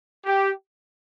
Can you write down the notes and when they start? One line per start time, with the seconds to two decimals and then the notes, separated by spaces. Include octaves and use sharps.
0.24 G4